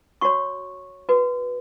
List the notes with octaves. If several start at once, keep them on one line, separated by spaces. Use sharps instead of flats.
F#4 C#5 C#6
F#4 B4